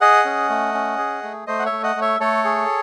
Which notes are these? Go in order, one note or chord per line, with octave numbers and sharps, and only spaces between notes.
G#4 D#5 F#5
C#4
A3
C#4
G#4
A3
A3 C5 D#5
F#5
C#5 E5
A3
D#5 F#5
A3
C#5 E5
A3 A4 C#5
G#4